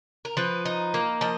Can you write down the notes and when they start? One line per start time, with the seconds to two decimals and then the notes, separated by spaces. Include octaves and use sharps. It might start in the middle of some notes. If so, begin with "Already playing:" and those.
0.25 A#4
0.37 F3 B4
0.65 D#4
0.94 A#3
1.21 F3 D#5